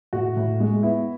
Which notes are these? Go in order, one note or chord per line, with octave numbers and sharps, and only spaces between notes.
A2 F#4
A2
G#3
B3 E4